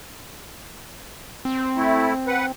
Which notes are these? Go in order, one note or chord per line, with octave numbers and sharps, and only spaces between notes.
C4
A3 E4
B4 F#5